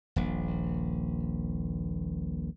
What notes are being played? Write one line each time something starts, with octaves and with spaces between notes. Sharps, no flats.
D#1 A#1